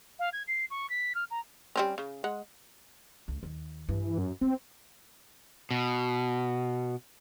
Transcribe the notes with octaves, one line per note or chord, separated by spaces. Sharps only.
F5
G#6
C7
C#6
B6
F6
A#5
G3 C4 C#4
C#3
G#3 F#5
C#2
D#2
G2 E3
F#2
B3 C4
B2